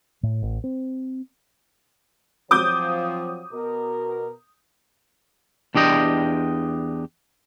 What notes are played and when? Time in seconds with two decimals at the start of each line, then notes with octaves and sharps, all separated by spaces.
0.23 A2
0.42 A1
0.64 C4
2.51 F3 F#3 C4 D6 D#6 G6
3.52 B2 A#4
5.75 E2 D4 G4 D#5 G5